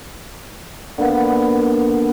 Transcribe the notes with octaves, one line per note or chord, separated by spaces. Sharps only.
D3 A#3 B3